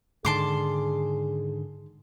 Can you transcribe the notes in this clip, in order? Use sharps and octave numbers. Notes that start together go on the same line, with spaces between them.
G#2 D3 D#3 G#4 A5 C6 D6